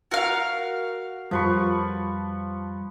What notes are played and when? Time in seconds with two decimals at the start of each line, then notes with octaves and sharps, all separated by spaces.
0.11 F#4 A#4 F5
1.31 F2 F3 G3 B4 C#6